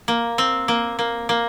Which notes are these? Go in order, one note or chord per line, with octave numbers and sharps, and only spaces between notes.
A#3
C4
A#3
A#3
A#3